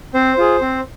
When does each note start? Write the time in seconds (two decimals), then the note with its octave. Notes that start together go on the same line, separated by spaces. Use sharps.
0.14 C4 C5
0.38 F4 G#4
0.61 C4